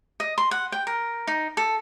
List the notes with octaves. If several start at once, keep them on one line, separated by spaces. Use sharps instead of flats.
D#5
C6
F#5
G5
A#4
D#4
A4